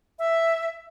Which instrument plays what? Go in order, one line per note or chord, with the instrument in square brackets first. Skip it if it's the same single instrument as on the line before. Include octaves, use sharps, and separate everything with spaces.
[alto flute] E5